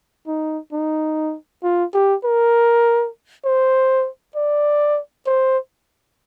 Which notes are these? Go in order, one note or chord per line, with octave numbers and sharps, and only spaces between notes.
D#4
D#4
F4
G4
A#4
C5
D5
C5